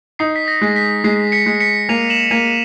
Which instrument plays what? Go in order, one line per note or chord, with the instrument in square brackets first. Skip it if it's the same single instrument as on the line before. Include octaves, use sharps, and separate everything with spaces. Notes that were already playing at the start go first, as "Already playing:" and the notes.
[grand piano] D#4 [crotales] C7
[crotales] B6
A#6
[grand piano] G#3
[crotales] B6
[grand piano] G#3 [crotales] C7
[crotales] B6 C#7
[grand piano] G#3
[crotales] B6 C#7
[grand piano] A#3 [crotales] D#7 F7
[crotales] E7 F#7
[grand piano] A#3 [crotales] D#7 F7